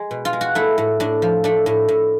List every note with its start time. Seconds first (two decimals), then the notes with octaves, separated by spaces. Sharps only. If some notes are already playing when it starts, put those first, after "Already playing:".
Already playing: G#3
0.11 B2
0.25 F4
0.33 G#3
0.41 F#4
0.55 A3 E4
0.78 A2
1.00 A2 D4
1.22 F3
1.44 A3 D4
1.66 A2
1.88 A2